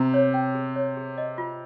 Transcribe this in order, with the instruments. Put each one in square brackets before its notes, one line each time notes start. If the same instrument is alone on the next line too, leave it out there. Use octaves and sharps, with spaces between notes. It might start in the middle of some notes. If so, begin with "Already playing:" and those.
Already playing: [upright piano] C3 [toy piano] A#5
[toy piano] C#5
G5
G#4
C#5
G#4
D#5
F4